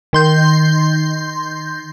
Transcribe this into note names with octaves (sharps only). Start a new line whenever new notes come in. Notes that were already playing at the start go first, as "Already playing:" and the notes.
D#3 C6 G6